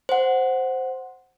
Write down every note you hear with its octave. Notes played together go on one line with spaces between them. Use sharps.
C5 F#5